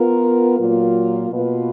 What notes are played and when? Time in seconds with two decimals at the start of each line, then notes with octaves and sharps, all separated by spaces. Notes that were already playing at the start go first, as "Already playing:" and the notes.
Already playing: B3 F4 A#4
0.59 A#2 F#3 A#3 F4
1.30 B2 A#3 F4 B4